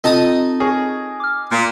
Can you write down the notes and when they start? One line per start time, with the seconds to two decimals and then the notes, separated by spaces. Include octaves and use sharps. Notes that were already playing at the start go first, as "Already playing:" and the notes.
0.04 C4 D#4 F4 A4 A5 D#6
0.60 G#4 A#4 C#5
1.20 D6 F6
1.51 A#2